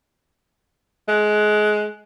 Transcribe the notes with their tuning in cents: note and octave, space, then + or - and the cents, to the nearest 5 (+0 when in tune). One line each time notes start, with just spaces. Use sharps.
G#3 +25